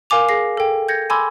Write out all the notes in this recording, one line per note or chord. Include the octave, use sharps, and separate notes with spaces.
A#4 F5 G#5 D6 F7
G#4 A#6 C7
A4 G5
G6 G#6 A#6 C#7
G#5 B5 C6 D6 E6 G#6